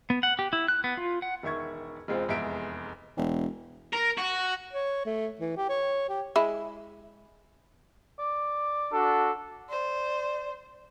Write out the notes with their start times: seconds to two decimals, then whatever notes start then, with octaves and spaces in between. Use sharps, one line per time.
0.10 B3
0.23 F#5
0.39 G4
0.53 E4
0.68 F#6
0.84 B3
0.97 F4
1.22 F#5
1.43 E1 D#3 E5 C#6 G#6
2.08 E1 G#3 C4 F4 C5
2.28 F1 E2 G#3 E5 D7
3.17 E1
3.93 A#4
4.18 F#4
4.73 C#5
5.06 A3
5.39 E3
5.57 G4
5.69 C#5
6.09 G4
6.36 G#3 E4
8.20 D5
8.92 D4 F#4 A4
9.69 C5 D5